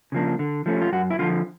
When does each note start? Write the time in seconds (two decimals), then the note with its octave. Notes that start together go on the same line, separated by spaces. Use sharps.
0.12 C#3 F3 A#3 D4
0.39 D3
0.66 F3 A3 C#4
0.81 F4
0.92 F#2 F#4
1.10 E4
1.19 D3 F3 F4